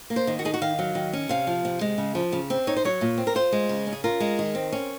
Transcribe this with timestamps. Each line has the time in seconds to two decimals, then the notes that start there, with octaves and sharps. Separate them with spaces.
0.10 A#3
0.16 C5
0.27 D#3
0.39 F#4
0.45 D#4 G#4
0.54 F#4
0.62 D#3 F5
0.79 F#3
0.95 D#3
1.13 C#4
1.29 C3 F5
1.47 F3
1.65 C3
1.81 G#3
1.98 C#3
2.15 F3
2.32 C#3
2.50 C4
2.67 D#4 C#5
2.76 C5
2.85 F#3 C#5
3.01 A#2
3.18 C4
3.27 A#4
3.35 F4 C5
3.52 G#3
3.69 C#3
3.87 C#4
3.93 G#4
4.04 F4 A#4
4.20 G#3
4.39 D#3
4.55 C4
4.72 C#4